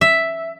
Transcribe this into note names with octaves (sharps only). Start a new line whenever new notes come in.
E5